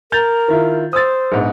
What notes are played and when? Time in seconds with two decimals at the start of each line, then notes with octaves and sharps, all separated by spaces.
0.12 A#4 G6 A6 F7
0.48 D#3 E4 F4
0.93 C5 D#6 E6 A6
1.32 A#1 G#2 B3